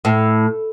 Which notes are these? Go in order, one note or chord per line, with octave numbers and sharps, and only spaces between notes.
A2